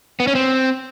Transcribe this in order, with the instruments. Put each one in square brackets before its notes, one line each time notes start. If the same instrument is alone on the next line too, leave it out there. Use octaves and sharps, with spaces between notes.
[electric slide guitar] B3
C#4
C4